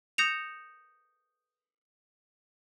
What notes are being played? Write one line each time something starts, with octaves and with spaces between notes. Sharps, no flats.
D#6 G6 A#6 C#7 E7 F7